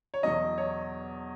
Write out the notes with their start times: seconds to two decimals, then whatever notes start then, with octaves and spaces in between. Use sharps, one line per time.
0.14 C#5
0.23 E2 B2 F#3 D#5
0.58 C#5